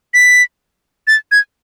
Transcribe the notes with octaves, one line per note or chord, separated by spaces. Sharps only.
B6
A6
G#6